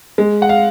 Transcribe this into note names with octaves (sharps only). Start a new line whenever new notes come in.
G#3
F#5
F5